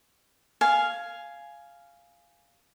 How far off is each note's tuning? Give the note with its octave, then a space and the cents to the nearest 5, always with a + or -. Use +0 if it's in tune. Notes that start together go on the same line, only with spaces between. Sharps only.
F5 -5 G#5 +10